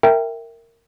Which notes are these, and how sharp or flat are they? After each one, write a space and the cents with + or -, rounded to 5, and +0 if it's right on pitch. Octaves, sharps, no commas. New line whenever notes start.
A#4 -15 E5 +0 G5 +0